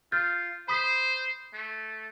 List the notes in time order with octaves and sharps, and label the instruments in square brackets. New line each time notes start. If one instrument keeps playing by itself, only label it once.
[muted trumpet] F4 [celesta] F6 G6 A6
[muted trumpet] C5 [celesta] B5 D#6 B6
[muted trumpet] A3